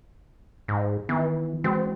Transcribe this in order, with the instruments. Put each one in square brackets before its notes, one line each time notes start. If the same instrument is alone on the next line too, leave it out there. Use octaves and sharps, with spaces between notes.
[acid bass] G#2
[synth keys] D#3 B3 [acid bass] E3
[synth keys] E3 G#3 F#4 [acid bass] C4